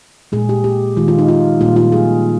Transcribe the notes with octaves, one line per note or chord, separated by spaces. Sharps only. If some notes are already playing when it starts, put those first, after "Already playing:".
A#2 G#3 G#4
G4
G4
D#3 G#3 F4
F4
D#4
F4
A#2 G3 A#3 F4
F4
G#4